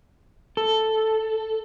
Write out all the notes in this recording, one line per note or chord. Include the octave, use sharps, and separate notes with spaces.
A4